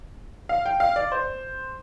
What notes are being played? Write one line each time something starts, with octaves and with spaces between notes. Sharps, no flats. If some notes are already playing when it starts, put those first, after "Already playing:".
F5
G5
F5
D5
C5